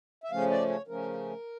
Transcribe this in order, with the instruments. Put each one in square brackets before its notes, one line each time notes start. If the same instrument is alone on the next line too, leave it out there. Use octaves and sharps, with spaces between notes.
[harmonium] E5
C#3 F3 A3 C#4 F5
D5
C#5
C#3 F3 A3 C#4 A#4